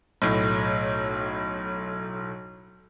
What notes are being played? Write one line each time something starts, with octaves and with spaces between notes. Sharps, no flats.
B1 A2